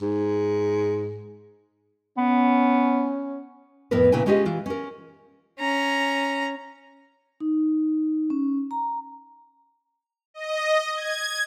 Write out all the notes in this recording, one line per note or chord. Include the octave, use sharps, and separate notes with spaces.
G#2
B3 C#4
F2 A2 B3 A#4 B4
A#2 C#3 E4 B4 G5 G#5
G#3 C#4 F4 G4 G#4 D#5
E3 F4
C#4 A#4
C#4 A#5
D#4
C#4
A#5
D#5
G#6